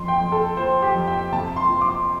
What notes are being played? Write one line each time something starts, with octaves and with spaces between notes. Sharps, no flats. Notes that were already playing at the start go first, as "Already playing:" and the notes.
Already playing: F2 C6
G5
F2
A4
F3 C5
G4
F2
G5
C3 A5
C6
F3
D6